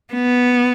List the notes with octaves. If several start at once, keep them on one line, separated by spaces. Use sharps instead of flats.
B3